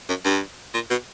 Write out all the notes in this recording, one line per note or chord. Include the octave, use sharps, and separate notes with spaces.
F#2
G2
A#2
B2